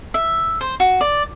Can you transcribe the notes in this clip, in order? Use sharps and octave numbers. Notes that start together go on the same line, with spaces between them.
E5
C5
F#4
D5